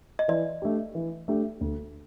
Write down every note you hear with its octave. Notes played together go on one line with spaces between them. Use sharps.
D#5
E3 D5
A3 D4 G4
E3
A3 D4 G4
D2